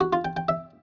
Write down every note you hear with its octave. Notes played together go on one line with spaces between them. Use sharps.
F#4
F4
G5
G5
E5